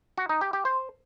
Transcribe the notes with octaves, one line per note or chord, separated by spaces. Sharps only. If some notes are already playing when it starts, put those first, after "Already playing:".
F#4
D#4
G4
G4
C5